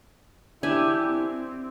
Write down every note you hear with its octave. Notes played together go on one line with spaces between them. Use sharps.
D4 E4 G4 E5 G#5
C4